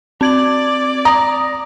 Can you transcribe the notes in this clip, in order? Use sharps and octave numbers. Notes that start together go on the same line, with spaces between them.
C4 D5 G#6 F#7
A#5 D#6